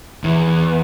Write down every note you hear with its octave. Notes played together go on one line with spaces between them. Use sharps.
E2